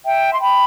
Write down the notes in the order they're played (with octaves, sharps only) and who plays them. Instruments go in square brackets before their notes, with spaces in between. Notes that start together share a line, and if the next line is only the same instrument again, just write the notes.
[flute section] E5 G5
C6
G5 B5